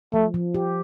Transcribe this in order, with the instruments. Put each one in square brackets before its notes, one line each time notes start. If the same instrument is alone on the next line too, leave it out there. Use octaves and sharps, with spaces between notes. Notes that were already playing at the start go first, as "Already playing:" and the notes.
[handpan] F3 [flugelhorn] A3
[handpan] F3
G4